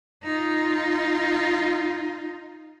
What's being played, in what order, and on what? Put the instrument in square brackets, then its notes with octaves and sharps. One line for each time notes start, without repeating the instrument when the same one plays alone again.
[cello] D#4 F4